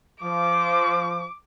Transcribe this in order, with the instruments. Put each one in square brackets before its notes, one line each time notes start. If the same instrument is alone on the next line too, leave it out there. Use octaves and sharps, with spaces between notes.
[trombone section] F3 [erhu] D6